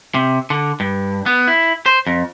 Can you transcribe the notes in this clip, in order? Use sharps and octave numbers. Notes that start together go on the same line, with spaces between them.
C3
D3
G2
B3
E4
C5
F2